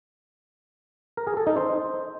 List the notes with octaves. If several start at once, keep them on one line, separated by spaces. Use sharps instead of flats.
A#4
G#4
A4
D#4
C5